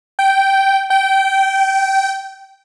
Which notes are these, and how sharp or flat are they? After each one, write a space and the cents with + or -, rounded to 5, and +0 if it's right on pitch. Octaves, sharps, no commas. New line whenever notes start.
G5 -10
G5 -20